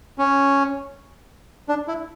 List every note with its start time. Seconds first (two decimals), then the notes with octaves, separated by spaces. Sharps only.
0.18 C#4
1.69 D4
1.88 E4